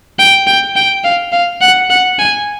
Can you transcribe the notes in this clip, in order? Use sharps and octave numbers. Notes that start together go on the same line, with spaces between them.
G5
G5
G5
F5
F5
F#5
F#5
G#5